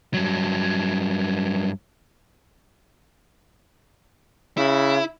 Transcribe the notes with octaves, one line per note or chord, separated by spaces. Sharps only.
G2 F#3
C#3 E4